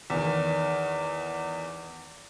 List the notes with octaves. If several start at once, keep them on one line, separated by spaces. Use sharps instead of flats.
E2 D#3